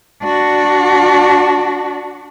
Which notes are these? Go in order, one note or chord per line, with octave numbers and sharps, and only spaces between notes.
D4 F#4